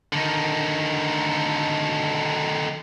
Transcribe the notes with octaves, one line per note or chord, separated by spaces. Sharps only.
D3 D#3